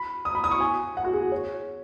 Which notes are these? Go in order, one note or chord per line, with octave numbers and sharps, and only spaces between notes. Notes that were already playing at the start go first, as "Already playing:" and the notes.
Already playing: B5
D#6
B5
D#6
C#6
G#5
F#5
F#4
G#4
C#5